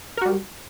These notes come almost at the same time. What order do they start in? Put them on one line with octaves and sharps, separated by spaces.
A#4 F#4 G3